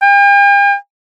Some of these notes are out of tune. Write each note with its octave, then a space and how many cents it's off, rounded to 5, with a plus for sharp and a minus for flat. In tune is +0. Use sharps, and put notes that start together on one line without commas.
G5 +45